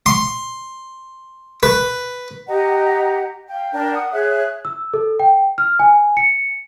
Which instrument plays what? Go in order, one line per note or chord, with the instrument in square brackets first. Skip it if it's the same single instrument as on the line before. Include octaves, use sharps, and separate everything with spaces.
[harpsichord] C6
B4
[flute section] G4 D#5 F#5 A#5
F5 G5
D4 A#4 G5
F#5 D#6
G#4 C#5 E5 F#6
[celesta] E6
A4
G5
F6
G#5
C#7